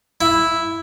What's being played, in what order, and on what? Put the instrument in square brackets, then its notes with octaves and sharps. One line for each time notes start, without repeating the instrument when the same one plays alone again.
[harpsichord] E4